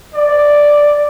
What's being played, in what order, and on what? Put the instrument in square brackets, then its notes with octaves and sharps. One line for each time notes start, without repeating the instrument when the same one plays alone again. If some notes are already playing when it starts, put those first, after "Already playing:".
[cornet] D5